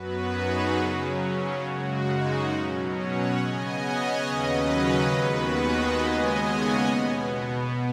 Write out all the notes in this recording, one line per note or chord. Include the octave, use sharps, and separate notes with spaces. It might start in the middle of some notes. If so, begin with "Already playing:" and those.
Already playing: F#2 F#3 B3 F#4 B4
D#4 G#4
C#3 F#3 C#4
F#2 C#3 G#3 F#4
D#4
B2 F#3 C#4
C#5 F#5
C#3 B3 D#5 G#5
C#5 F#5
D#2 C#3 F#3 C#4 B4 D#5
D#2 D#3 G#3 B3 F#4 B4
B4 D#5
D#2 C#3 G#3 B3 D#5 G#5
C#5 F#5
B2 B3